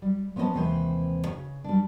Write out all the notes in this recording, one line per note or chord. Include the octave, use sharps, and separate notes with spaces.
G3
F3 B3 C#4 G#4 D#5 A5
D#2 C3 E3 G#3 C5
C#3
G3 D4